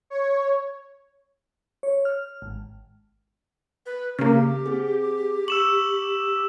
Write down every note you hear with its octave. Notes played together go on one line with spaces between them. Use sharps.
C#5
C#5
F6
G#1
B4
C#3 A#3 G4 F6
C4 G#4
C#6 E6 E7 F#7